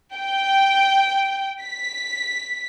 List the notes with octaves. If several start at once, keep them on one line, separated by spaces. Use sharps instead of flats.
G5
B6